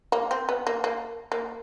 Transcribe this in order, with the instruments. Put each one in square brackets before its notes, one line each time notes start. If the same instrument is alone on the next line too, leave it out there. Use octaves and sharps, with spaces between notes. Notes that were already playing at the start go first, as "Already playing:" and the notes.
[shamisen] A#3
C4
B3
A#3
A#3
A#3